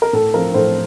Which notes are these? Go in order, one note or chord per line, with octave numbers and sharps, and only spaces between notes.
A#4
A2 A4
F3 A#4
A2 C5